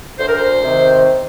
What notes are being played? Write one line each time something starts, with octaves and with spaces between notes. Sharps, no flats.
D2 C5
A#4
C5
C3 D#3